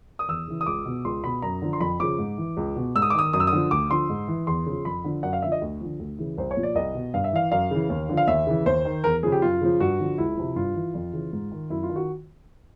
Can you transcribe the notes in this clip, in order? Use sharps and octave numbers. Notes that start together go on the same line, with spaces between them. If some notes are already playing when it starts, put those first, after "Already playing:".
D#6
E2 E6
C#3 E3
D#6
C#2 D6
B2
C#2 C6
B2 B5
F#2 A#5
D3 F3
C6
F2 B5
C#3 F3 D6
G#2
E3
C#2
B2
G#2 E6
D#6
D6
D#3 D#6
F#2 D#6
E6
D#6
D3 F3
D2 D6
D3 F3 C6
G#2
E3
E2 C6
C#3 F3
F2 B5
D3 F3
F#2 F#5
F5
D3 F3 E5
D#5
D2
D3 F3
D2
C#3 E3
C2 C5
C#5
A#2 F3
D5
C2 D#5
B2
G2 F5
E5
E3 F5
F#2 F5
C#3 E3
D#2
D3 F3
F5
D#2 E5
C#3 E3
D#2 C5
D#3
E2 A#4
C#3 F3 G#4
G4
F#2 F4
C#3 F3
G2 F#4
D3 F3
C#2 E4
C3 F3
G2 F4
E3
F2
C#3 E3
G#2
D#3
F#2 E4
F4
D#3
F#4